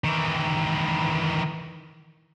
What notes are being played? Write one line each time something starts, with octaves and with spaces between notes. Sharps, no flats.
D#3 E3